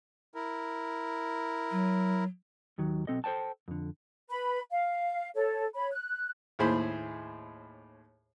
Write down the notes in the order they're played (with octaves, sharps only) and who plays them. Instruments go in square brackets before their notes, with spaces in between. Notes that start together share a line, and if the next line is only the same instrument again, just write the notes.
[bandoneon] E4 A#4
[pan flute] F#3
[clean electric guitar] D#2 D#3 F#3
B1 C4 A4 D#5
A4 C5 C#5 G5 A5
F2 D3
[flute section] B4 B5
F5
A4 C#5
C#5 B5
F#6
[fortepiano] D#2 A2 G#4 C5 B5